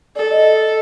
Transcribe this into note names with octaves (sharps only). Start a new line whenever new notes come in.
A4 D5
D#5